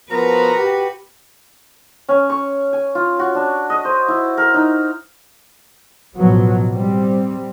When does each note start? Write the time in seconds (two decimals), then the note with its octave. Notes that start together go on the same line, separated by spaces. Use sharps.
0.11 F3 B3 F#4 A#4 B4 A#5
0.56 G4
2.09 C#4
2.30 C#6
2.73 G#5
2.95 F4
3.19 F#4
3.35 D4
3.70 D#5
3.85 C5
4.08 E4
4.37 A#4
4.54 D#4
6.15 A1 B2 F3 F#3 B3
6.70 G3 C4